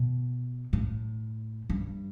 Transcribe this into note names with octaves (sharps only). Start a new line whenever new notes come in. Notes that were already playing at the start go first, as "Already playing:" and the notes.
Already playing: B2
A2
G2